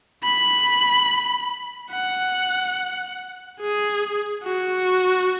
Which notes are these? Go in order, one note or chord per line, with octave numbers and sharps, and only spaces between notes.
B5
F#5
G#4
F#4